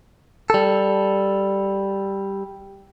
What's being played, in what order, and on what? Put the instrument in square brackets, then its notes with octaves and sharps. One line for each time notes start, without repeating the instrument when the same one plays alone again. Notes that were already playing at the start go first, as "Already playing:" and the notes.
[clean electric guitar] G3 A4